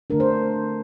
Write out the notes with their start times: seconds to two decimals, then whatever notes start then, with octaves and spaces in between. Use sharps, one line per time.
0.10 D3 A3 D4 A#4
0.20 C5